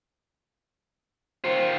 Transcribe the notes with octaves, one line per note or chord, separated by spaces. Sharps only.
D#3 F4 C5